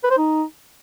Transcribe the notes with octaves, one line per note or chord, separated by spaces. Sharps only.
B4
C5
D#4